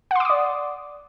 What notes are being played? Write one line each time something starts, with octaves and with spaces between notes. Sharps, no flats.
D5 F#5 C6 D6 D#6